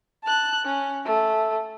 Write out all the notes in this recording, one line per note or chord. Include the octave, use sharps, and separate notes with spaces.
A5 F#6
C#4
A3